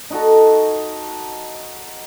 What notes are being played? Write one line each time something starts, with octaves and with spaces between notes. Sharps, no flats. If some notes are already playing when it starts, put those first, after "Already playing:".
D#4 F#4 A4